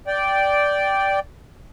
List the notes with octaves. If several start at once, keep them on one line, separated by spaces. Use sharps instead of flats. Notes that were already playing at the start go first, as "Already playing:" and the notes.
D5 G5